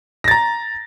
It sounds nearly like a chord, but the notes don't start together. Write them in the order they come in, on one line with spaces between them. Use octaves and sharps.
A#6 A6 A#5